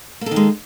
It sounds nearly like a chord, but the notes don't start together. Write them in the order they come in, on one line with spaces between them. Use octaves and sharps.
A#3 A4 D#3 G#3